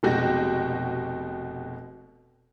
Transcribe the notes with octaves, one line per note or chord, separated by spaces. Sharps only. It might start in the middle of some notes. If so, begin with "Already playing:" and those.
F1 B2 G#3 F#4 G4 A#6